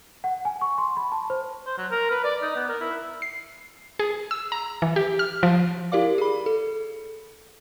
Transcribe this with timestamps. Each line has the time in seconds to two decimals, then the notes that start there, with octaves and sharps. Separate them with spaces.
0.24 F#5
0.45 G#5
0.61 C#6
0.78 C6
0.97 B5
1.12 A5
1.30 C5
1.66 C5
1.78 F#3
1.91 A#4
2.11 B4
2.24 D5
2.42 D#4
2.56 B3
2.69 A#4
2.81 E4
3.22 C7
3.99 G#4
4.31 E6
4.52 A#5
4.82 E3
4.96 G4
5.19 F6
5.43 F3
5.92 E4 G4 A#4 D5 F5 D6
6.18 G#4 B5
6.46 A4